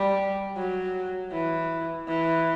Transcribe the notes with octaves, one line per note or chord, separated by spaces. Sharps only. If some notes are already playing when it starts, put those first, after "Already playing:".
Already playing: G3
F#3
E3
E3